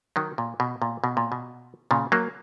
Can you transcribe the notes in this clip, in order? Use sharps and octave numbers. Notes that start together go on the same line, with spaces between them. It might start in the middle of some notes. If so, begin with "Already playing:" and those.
D#3 F#3
A#2
B2
A#2
B2
A#2
B2
A#2 C#3
F#3 A#3